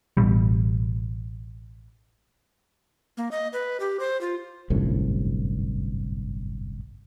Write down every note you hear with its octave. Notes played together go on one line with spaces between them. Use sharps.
A1 B2 G3
A#3
D#5
B4
G4
C5
F4
G1 C2 F#2 A2